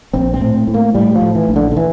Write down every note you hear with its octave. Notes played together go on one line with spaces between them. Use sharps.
A#1 C4
C4
A2
C4
A2
A#3
A2 G3
F3
A2
E3
A#1
D3
D3
E3